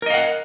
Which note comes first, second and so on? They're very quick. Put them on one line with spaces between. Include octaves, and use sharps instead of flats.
A#4 D#5 F5 F#5